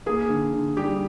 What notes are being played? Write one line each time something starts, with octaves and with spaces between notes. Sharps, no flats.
A#3 G#4
D3
D3
G3 G4